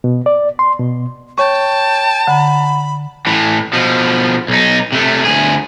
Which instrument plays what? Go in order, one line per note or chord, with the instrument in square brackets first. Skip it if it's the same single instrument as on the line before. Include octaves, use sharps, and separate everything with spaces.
[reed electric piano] B2
D5
C6
B2
[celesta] C#5 C#6 [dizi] G5 [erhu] A5
[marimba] D3 [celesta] F#5 A#5 [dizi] B5
[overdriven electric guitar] A2 E3
B2 F3
B1 D#4
C3 A3
D2 G#4